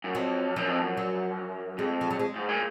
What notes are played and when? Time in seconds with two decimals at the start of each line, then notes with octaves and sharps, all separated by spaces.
0.04 F#2
0.15 F2 F#3
0.56 F#2 F3
0.69 F2
0.81 F#2
0.97 F#3
1.78 F2 G#3
2.01 F3
2.11 F#3
2.19 G#3
2.36 G#2
2.49 A#2